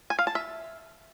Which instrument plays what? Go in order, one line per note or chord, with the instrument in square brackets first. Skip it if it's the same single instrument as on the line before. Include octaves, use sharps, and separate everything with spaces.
[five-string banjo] G#5
F5
A5
E5